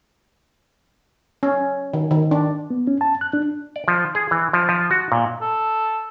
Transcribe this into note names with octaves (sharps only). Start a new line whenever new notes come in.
C#4
D#3
D#3
D4
B3
C#4
A5
F#6
D4
D5
F3
G#4
E3
F3
F3
F#4
A#2
A4